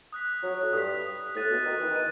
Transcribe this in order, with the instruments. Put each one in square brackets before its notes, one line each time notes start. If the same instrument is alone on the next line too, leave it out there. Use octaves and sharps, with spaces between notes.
[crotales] D#6 F#6 B6
[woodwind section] F#3
A2
[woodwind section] G2 [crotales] D#6 F#6 B6
[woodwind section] A2 [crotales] F#6 A6 D#7
[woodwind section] B2
D#3
E3
D#3
[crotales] D#7